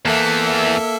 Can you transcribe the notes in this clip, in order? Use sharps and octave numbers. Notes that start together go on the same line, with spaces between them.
E2 E3 A#3 A4 E5